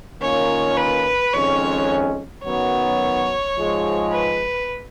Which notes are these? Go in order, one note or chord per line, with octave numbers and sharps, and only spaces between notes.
D#3 A#3 C#4 F4 A#4 C#5
B4
F2 D#3 G#3 C#4 C#5
F#2 D#3 F#3 B3 C#5
G#2 F3 G#3
B4